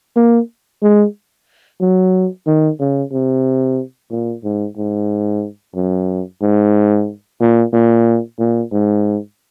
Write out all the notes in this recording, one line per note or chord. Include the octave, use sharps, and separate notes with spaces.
A#3
G#3
F#3
D#3
C#3
C3
A#2
G#2
G#2
F#2
G#2
A#2
A#2
A#2
G#2